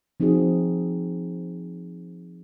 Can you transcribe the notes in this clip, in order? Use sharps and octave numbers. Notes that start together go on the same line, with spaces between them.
F3 C4 D#4 F#4 G#4